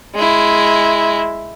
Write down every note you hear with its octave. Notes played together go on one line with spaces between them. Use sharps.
G#3 E4